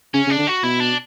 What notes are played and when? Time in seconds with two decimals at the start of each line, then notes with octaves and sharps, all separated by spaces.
0.14 C#3 C#4
0.27 C#3 D4
0.38 D3
0.47 F#4
0.63 B2 E4
0.80 D4